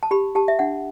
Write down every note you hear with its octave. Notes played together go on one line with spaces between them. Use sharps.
A5
G4 B5
G4 A5
E5
D4 F#5